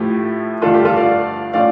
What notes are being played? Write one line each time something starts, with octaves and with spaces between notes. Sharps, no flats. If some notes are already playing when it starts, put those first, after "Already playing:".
Already playing: A2 F3 A3 E4 G4
G2 D3 F3 A3 D4 F4 A4
G4
F4 A4
D5 F5
A2 F3 A3 C#4 F4 D5 F5